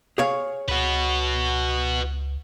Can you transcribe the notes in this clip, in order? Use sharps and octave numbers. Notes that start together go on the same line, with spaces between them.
G#4 C#5 F5
C#2 F#4 B4